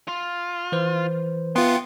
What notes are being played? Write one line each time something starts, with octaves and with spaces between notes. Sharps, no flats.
F4
E3 B4 C5
B3 F4 E5 G5 C6